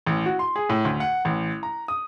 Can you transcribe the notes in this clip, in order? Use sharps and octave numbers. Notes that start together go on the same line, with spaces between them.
A1
F#4
C6
G#4
A2
D2
F#5
A1
A#5
D#6